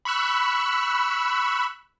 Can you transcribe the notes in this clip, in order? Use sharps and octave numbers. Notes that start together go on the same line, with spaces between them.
B5 C#6 E6 F#6